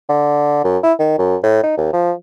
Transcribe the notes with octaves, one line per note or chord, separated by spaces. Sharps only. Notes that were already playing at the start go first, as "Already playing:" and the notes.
D3
F#2
E4
D#3
F#2
A2
D#4
D#2
F3